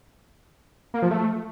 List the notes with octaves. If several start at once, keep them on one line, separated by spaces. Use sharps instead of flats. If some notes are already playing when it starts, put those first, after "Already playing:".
A#3
F3
A3